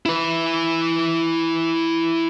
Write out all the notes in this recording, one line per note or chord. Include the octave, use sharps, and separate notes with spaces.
E4 B4